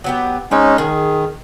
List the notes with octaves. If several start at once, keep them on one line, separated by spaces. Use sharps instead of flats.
F#3 B3 G4
G#3 C4 C#4 D#4 C#5
D#3 G#4 G#5